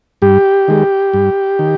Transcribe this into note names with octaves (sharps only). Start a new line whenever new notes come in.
G2 G4
D#3 G#3
G2
D#3